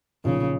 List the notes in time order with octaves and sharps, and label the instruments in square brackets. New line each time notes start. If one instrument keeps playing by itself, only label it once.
[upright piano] B1 A#2 F3 [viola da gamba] C#3